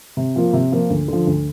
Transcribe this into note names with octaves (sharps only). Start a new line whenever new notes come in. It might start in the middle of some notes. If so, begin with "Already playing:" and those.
C3
F3 A#3 F4
C3
F3 A#3 F4
D2
D3 F3
D2